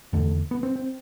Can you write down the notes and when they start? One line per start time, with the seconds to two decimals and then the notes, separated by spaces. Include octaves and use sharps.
0.13 E2 D3 A3
0.51 B3
0.63 C4
0.76 C4